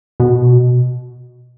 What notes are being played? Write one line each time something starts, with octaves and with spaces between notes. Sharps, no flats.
B2